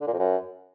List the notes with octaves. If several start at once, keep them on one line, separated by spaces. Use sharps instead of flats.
D3
A#2
F2
F#2